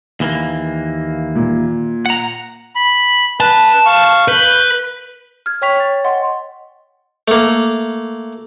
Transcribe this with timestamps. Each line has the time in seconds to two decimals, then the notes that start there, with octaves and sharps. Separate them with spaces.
0.20 D#2 E3 A#3
1.35 A#2
2.06 F#5 A#5
2.75 B5
3.40 B4 A5
3.86 F5 C#6
4.28 B4 G6
5.46 F6 G#6
5.62 C#5 G5 C#6 B6 F7
5.80 A6
6.04 D#5 F#5 C6
7.28 A3 A#3